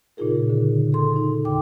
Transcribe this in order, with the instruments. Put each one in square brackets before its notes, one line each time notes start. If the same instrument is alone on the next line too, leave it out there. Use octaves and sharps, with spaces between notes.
[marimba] A#2 C#3 D#4 F4 G#4 A#4
D3
A4 C6
D#4
E2 D3 G5 D6